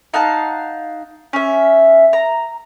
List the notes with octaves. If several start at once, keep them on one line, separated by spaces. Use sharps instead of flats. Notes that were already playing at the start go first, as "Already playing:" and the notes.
D#4 F5 F#5 A5
C#4 E5
A#5